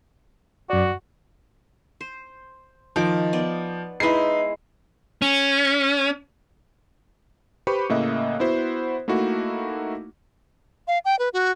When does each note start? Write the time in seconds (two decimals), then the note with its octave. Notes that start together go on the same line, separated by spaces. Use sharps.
0.70 F#2 F#4 D5
2.01 C5
2.96 D#3 F3 D6
3.33 B3 D5
4.00 G#3 D#4 E4 B4 C7
5.22 C#4
7.67 G4 B4 C5 B5 C#6 C#7
7.89 A2 C#3 A#3 D#5 E5 F#6
8.40 B3 E4 F#4 C5
9.08 A3 A#3 D#4 E4 F#4
10.88 F5
11.05 G5
11.19 B4
11.33 F#4